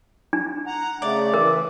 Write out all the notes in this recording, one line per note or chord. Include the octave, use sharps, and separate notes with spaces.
D4
F#5 A#5
C#3 A3 D5
E3 A#4